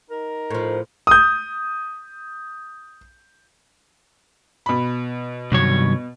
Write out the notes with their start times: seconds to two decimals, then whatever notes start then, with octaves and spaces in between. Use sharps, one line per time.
0.11 D#4 A#4
0.50 A2 F3
1.07 D#6 G6
4.66 B2 B5
5.52 C2 G2 C3 D#3 F#3 C#5